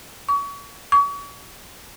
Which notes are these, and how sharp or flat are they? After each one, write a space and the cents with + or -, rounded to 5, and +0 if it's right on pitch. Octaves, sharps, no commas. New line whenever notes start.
C#6 +35
C#6 +40